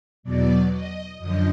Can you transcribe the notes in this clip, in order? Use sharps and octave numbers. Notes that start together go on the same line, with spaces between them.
E2 B2 F#3 D5
D#5
F#2 D3 F3 D#5